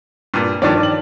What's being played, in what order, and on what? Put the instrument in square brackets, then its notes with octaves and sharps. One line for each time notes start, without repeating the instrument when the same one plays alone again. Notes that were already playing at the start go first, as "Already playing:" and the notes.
[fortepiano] G2 A#2
[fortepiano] G2 D#3 D4 [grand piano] F3 C#5 D5
[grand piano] D5 F#7